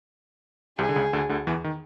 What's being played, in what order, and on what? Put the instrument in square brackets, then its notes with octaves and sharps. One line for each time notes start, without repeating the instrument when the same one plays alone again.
[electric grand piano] C2 C3 [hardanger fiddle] G#4
[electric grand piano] D3
C#2 C#3
D2 D3
D2 D3
E2 E3
D#3